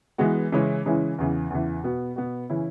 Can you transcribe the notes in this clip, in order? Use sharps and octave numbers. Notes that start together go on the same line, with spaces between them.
E3 G#3 B3 F#4
C#3 E3 G#3 C#4 E4
C#3 E3 G#3 C#4 E4
E2 C#3 E3
E2 C#3 E3
B2 B3 F#4
B2 B3 F#4
C#3 E3 C#4 E4